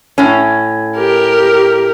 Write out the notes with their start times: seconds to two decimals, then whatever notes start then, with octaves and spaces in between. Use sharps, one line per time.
0.18 A2 C#4
0.97 G4 A#4